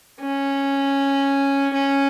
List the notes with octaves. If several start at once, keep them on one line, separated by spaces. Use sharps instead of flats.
C#4
C#4